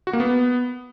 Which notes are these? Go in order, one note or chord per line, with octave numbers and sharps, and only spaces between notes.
F#4
A#3
B3